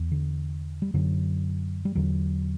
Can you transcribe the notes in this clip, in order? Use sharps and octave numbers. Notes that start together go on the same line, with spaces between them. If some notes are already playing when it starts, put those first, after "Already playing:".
Already playing: E2
D3
G3
F#2 D3 F#3
G3
E2 D3 F#3